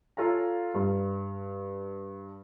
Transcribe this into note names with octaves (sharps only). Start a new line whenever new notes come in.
F4 A4 C#5 F5 G#5 A#5
G2